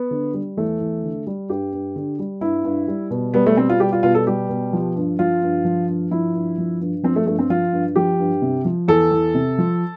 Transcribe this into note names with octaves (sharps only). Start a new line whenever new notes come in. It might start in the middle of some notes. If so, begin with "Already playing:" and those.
Already playing: B3
D3
G3
E2 A3
E2
D3
G3
G2 G4
G2
D3
G3
G2 E4
G2
G3
B2
G3 B3
A3
B2 C4
F4
G3 G4
F4
B2 F4
A4
G3 G4
B2
F3
G2
F3 F4
G2
F3
G2
F3 E4
G2
F3
G2
F3 C4
A3
G2 A3
C4
F3 F4
G2
F3 G4
G2
C3
F3
E2 A4
E2
C3
F3